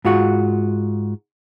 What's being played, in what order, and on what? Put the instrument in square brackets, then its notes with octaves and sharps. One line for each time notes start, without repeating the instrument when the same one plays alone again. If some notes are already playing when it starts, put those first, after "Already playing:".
[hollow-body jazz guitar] G#2 F4 F#4